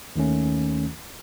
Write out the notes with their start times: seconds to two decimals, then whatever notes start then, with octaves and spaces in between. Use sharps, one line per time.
0.16 D#2 D#3 A3 C#4